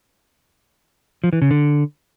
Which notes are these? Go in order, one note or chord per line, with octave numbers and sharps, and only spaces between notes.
F3
E3
C#3
D3